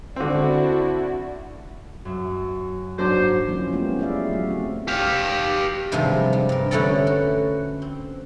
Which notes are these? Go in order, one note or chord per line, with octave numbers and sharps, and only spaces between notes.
D3 C4 D4 E4 F#4
F#2 F#4 E5
G#2 F#3 D4 C5 D6
F3 F#3 A#3 C#4 E4
G#3 A3 B3 C#4 F4 G4
E4 G#4 D5 E5 F5
F#3 A3 F#4
A3 C4
G4 F5
G2 C3 D#3 F3 G3 G#3
G3
G2 A#4
D3 A3 B3 C#4 A4 D5
F#4
C4